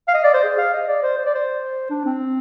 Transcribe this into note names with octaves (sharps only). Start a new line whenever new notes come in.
F5
D#5
D5
C5
G#4
F5
D#5
D5
C5
C5
D5
C5
D4
C4